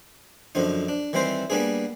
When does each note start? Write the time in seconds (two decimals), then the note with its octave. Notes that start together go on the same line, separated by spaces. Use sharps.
0.55 F#2 D3 F3 D#4
0.88 D4
1.13 D#3 E3 G3 C4 C5
1.50 G3 A#3 B3 D4 G#4